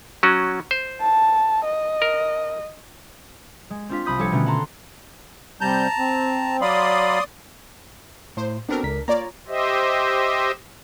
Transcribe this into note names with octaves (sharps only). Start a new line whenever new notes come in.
F#3 C#4 F#4
C5
A5
D#5
A#4
G#3
C4 D4 F4 B6
C2 B5 D#6 G6 B6
F3 G3 G4 A4 C#5 C#7
B2 D3 D#3 A3 B3 C#4
F#5 A5 A#5 C6
C3 G3 A5 A#5 G6
C4
F#3 D5 F5 B5 C6 D#6
A2 C5
B3 C4 D4 F#4 A4 A#4
C#2 B6
A#3 F4 C#5 D5 A#5
G4 C5 D#5 E5